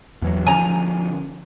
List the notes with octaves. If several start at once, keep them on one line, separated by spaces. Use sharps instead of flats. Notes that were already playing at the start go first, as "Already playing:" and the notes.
E2 E3 F#3
D3 F3 C#4 G#5 A#5